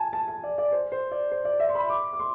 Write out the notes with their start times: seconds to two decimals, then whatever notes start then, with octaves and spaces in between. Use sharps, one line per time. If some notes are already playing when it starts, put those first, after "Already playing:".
Already playing: G#5 A5
0.13 A5
0.28 A5
0.43 D5
0.58 D5
0.72 C5
0.92 C5
1.11 D5
1.31 C5
1.45 D5
1.60 E5
1.69 C6
1.75 B5
1.90 D6
2.13 D6
2.20 C6